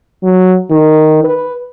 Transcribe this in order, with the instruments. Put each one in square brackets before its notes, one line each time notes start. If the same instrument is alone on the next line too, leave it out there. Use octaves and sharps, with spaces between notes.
[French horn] F#3
D#3
B4